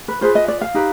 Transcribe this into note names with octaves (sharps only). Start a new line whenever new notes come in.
B4
F4 G#4 B4 C5
D#5
D5
F5
D#4 G4 B4